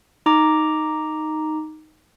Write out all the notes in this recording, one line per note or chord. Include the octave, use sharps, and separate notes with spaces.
D#4 A#5 D6